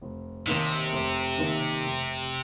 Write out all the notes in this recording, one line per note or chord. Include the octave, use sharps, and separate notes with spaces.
F1
D#2 C3 D#3 A#3 D#4
F1
D#2 D#3 A#3 D#4
F1